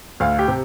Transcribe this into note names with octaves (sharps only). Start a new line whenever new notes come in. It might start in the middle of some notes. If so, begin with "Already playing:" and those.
D2 F5
G4
C3